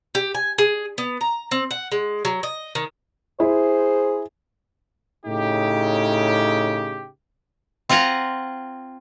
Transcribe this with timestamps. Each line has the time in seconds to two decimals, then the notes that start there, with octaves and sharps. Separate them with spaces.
0.15 G4
0.35 G#5
0.58 G#4
0.98 B3
1.21 A#5
1.51 C4
1.71 F#5
1.92 G#3
2.25 F#3
2.43 D#5
2.75 D#3
3.40 E4 G#4 C5
5.25 A2 C#3 D#4 G4
7.89 C4 F4 F#5 G#5 A#5